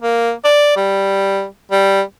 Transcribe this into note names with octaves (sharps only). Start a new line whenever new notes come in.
A#3
D5
G3
G3